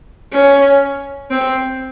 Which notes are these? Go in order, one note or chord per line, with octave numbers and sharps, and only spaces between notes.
C#4
C4